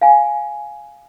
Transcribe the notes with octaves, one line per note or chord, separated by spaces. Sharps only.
F5 G#5